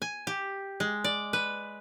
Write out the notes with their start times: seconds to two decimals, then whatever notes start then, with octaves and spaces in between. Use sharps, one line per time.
0.02 G#5
0.27 G4
0.80 G#3
1.04 D5
1.33 B4